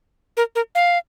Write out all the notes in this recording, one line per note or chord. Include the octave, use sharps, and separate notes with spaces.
A#4
A#4
F5